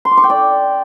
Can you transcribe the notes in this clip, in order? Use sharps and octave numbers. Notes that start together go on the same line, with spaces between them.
C6
D6
C#6
G5
D5